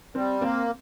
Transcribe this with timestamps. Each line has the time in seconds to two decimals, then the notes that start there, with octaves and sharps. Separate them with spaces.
0.15 G3 C4
0.41 A#3 C4